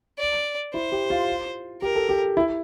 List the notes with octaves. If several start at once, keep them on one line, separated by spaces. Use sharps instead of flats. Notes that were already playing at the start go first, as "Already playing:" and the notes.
D5
E4 C5
G4
F4
G4 A#4
A4
G4
E4